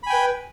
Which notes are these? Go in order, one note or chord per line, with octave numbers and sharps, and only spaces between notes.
B4 G5 G#5 B5